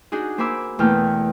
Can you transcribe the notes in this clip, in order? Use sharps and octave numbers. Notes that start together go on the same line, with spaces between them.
D4 D#4 F#4 G#4
A#3 C5 G#5 B5 D6 E6
E2 B2 A3 A#3 G5 F6